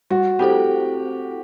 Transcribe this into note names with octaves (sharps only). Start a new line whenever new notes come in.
G3 F#4
C4 E4 G4 A4 C5